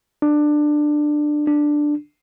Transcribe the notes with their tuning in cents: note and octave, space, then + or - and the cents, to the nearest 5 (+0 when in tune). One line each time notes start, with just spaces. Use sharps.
D4 +15
D4 +5